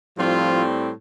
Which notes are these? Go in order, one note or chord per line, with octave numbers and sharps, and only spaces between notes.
A2 F3 G3 C4 F4